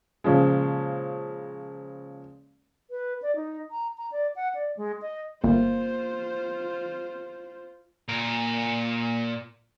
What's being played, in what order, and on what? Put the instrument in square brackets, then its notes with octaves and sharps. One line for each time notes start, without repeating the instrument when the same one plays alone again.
[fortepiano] A#2 C#3 F3 G#3
[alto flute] B4
D5
D#4
A#5
A#5
D5
F#5
D5
G#3
D#5
[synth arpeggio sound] G1 [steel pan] A#3 [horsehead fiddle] F4 C5
[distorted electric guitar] A#2 A#4